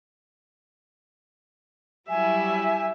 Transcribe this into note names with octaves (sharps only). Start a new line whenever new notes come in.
F#3 G3 E4 E5 G#5